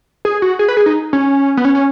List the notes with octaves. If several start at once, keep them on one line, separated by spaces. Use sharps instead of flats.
G#4
F#4
G#4
B4
G#4
D#4
C#4
B3
C#4
C#4